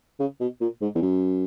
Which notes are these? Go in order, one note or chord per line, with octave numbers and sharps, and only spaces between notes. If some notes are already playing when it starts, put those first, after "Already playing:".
C#3
B2
A#2
G#2
E2
F#2